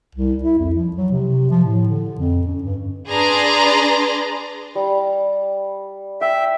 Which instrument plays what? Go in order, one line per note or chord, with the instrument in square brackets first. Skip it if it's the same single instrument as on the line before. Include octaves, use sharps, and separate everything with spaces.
[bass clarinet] C2
E4
F2
F3
F#3
C3
F3
A2
D3
F2
C#4
G2
[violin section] D4 G#4 B4 A#5 C6 A6
[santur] G3
[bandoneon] E5 [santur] G5